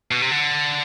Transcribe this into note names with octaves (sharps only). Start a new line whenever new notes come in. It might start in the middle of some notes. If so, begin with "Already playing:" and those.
B2
C3
D3